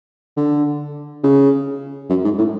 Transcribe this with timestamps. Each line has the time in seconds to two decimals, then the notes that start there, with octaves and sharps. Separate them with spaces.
0.37 D3
1.24 C#3
2.10 F#2
2.24 G#2
2.38 A2